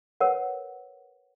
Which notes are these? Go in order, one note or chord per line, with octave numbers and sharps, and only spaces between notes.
A#4 B4 C#5 F#5